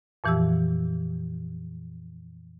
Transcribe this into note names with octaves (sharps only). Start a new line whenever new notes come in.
F2 A#2 E3 F3 G4 E6